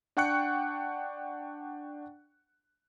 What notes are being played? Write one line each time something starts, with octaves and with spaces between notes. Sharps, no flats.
D4 F#5 G5 C#6 F#6 C#7